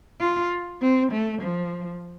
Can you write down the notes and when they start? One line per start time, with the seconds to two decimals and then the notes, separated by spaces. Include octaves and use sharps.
0.20 F4
0.81 C4
1.12 A3
1.42 F3